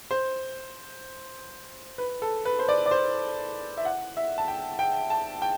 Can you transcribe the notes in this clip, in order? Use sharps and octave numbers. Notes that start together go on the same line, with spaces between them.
C5
B4
A4
B4
C5
D5
D5
C5
E5
F#5
E5
A5
G5
G5
A5
G5